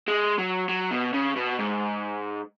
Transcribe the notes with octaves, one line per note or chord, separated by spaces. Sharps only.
G#3
F#3
F#3
B2
C#3
B2
G#2